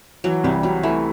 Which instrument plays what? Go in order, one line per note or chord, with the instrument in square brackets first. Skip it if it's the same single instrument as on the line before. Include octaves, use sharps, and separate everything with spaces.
[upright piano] E3 [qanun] F#3
[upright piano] C2 [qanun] G3
[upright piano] C3 [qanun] F#3
[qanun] E3 [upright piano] A3